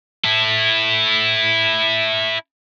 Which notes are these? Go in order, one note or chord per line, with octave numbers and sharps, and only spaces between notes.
E4 A4